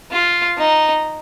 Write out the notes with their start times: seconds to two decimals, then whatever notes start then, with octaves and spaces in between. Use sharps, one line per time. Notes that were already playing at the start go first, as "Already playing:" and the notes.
0.11 F4
0.58 D#4